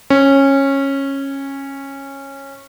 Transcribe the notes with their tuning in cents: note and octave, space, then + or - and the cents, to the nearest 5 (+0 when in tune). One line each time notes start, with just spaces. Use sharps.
C#4 -15